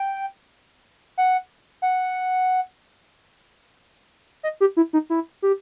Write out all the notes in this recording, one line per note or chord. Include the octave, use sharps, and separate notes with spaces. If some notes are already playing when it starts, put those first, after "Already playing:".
Already playing: G5
F#5
F#5
D#5
G4
E4
D#4
E4
G4